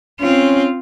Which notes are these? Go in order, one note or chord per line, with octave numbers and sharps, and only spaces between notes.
C4 C#4 F4